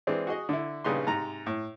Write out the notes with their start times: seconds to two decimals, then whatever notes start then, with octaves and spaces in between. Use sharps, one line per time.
0.07 E3 G#3 C4 D4
0.27 F#4 G#4 D#5
0.49 D3 E4
0.84 A#1 G2 C#3 D#4 B4 C6
1.07 G#2 C3 A#5
1.46 A2